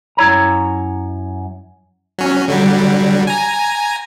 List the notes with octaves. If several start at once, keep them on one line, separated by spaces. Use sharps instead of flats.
F#2 E4 C#5 A#5
F#3 C#4
D3 F#3 G3
G#5 A#5